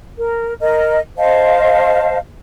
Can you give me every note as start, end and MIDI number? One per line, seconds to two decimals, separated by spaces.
0.18 0.53 70
0.61 0.98 70
0.61 0.98 75
1.18 2.17 72
1.18 2.17 75
1.18 2.17 77
1.18 2.17 81